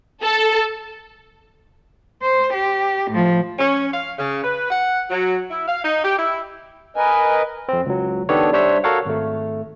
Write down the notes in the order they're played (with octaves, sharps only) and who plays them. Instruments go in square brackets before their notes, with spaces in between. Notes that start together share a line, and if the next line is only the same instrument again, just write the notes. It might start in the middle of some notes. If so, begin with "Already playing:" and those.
[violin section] A4
[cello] C5
G4
A2 F3
[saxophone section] C#4
F5
C#3
B4
F#5
F#3
E4
F5
D#4
G4
E4
[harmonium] A#4 B4 D#5 [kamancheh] G#5
[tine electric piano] F2 C4
C#2 F#3
D#3 B3 D4 G4 A4 C#5
G3 D4 C5 C#5 E5 B6
F#4 A4 A#4 C#5 F5 F#5
G#1 A3